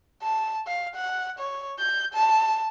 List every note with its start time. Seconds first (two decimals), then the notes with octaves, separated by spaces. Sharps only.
0.22 A5
0.67 F5
0.95 F#5
1.39 C#5
1.79 G6
2.14 A5